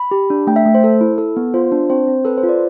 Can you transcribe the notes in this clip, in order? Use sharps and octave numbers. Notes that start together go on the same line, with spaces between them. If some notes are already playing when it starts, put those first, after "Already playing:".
Already playing: B5
G4
D4
A3 G5
E5
A3
C5
A4
E4
A4
B3
F4 C5
D4
C4 C5
C4
A4 B4
C5
F4
D5